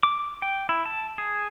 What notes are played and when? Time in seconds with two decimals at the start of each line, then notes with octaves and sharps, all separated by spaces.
0.03 D6
0.42 G5
0.69 E4
0.86 A5
1.18 G#4